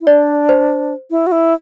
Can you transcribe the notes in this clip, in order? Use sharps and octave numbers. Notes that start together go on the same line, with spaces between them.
E4
D4 D5
C5
E4
F#4
E4